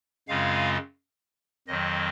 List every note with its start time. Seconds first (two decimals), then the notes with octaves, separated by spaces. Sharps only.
0.28 F#2 C#3 G#3 C4 F4 F5
1.68 F2 D#3 F#3 C4 D#5